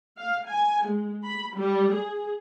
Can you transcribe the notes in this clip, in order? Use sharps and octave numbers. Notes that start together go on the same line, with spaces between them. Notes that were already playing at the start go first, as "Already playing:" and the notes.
F5
G#5
G#3
B5
G3
G#4